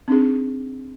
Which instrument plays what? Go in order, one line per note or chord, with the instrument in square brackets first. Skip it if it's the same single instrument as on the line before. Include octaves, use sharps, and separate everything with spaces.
[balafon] C4 D4 D#4 G#4